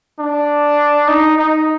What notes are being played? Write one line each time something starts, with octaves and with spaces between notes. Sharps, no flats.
D4
D#4
D#4